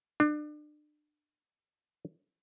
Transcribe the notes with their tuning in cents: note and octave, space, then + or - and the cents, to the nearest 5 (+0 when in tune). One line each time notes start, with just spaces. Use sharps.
D4 +35